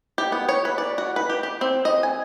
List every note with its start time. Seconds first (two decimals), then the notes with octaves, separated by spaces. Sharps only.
0.18 G4
0.32 B3
0.49 C#5
0.65 B4
0.78 D5
0.98 F#4
1.16 B4
1.30 G4
1.43 G4
1.61 C4
1.85 D#5
2.03 G#5